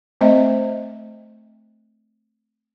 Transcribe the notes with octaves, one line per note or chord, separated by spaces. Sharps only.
A3 C4 C5 D#5 E5